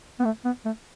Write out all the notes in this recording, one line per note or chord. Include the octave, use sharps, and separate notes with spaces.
B3
A3
B3
A3